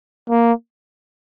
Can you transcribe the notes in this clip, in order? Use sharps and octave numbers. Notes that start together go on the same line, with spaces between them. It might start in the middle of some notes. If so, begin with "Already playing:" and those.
A#3